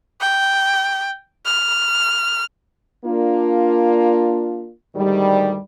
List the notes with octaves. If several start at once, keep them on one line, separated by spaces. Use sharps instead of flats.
G5
F6
A#3 D4 F4
D2 G#2 D#3 G3